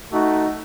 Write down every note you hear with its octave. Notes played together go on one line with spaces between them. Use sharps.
A3 D#4 F#4